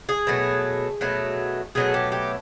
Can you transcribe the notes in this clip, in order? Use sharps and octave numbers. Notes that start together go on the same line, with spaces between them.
G#4
B2 F#3 A3
B2 F#3 A3
B2 F#3 A3 G#4
G4
G4